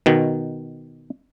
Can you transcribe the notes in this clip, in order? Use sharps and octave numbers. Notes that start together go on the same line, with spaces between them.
B2 D#3